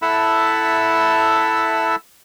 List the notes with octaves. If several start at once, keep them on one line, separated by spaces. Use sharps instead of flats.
E4 A4 E5 F#5 A5 B5